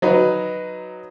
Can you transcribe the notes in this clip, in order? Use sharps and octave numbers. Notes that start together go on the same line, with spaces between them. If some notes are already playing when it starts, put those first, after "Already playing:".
F#3 D#4 B4